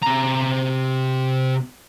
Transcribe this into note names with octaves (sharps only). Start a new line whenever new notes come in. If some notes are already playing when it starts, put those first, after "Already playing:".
C3 A#5